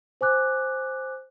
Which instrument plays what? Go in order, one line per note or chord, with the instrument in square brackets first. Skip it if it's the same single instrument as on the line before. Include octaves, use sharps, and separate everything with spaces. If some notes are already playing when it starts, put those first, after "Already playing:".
[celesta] C5 G#5 D6 F#6